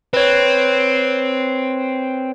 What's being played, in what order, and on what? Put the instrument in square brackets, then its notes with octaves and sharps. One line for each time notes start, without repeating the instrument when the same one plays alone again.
[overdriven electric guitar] C4 [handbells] B4 C#5